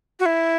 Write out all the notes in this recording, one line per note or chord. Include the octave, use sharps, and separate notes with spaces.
F#4
E4